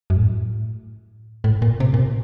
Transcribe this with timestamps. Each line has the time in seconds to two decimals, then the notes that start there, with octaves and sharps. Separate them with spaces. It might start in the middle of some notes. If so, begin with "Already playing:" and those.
0.10 F#2
0.16 A2
1.44 A2
1.62 A#2
1.80 C3
1.94 A#2
1.99 C3